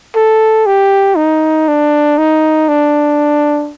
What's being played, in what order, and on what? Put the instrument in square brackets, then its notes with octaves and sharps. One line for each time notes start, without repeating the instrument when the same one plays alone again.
[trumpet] A4
G4
D#4
D4
D#4
D4